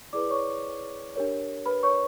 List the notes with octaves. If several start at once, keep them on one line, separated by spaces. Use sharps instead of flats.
E4 G#4 B4 D5 D6
C#5 C#6
D4 G4 A#4 C#5
B4 B5
C#5 C#6